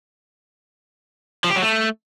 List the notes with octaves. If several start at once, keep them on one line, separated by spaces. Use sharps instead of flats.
F3
G4
F#3
A3